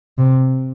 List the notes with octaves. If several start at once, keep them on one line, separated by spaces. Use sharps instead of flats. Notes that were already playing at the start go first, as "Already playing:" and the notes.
C3